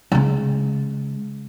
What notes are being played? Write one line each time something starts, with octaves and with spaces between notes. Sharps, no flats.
C#3 G#3